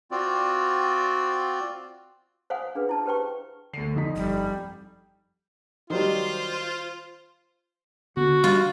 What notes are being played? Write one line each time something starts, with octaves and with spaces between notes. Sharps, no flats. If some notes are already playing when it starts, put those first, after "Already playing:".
C4 F4 F#4 D5
C5 F5 F#5 G#5 D#6
D4 G#4 B4
E4 A5
G4 B4 C5 G5 C#6
D2 D3 C7
F2 D#4 B6
G1 G3
D#3 F#3 G3 F4 C5
D3 B3 F#4
G3 F4